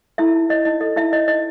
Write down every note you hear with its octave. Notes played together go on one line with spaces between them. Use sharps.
E4 A4 E5
D#4
C#5 D#5
D#4 D#5
A4 D#5
D#4 E4 E5
C#5 D#5
D#4 D#5